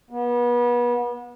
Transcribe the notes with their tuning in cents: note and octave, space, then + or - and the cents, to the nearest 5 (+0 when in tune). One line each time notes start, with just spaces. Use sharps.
B3 -30